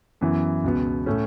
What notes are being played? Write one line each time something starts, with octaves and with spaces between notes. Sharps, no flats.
F#2 E3 B3 E4
C#2 B2 B3
A2 A3 C#4